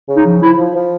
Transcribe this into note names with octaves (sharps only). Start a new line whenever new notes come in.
C#3
D#4
F3
F3 E4
F3
F3